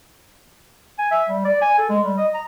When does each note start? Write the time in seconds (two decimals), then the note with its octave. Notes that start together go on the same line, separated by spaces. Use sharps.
0.99 G#5
1.11 E5
1.29 G3
1.45 D5
1.61 G#5
1.78 A4
1.89 G#3
2.03 G3
2.17 D#5
2.34 A#5